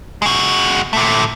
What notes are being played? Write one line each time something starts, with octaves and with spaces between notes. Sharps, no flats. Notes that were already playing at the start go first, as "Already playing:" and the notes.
G#3 F#4
A#2 A3